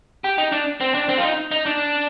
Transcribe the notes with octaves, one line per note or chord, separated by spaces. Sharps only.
G4
D#4
D4
C4
D4
C4
F4
D#4
D#4
D4